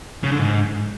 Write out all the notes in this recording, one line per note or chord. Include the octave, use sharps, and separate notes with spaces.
C#3
D3
G#2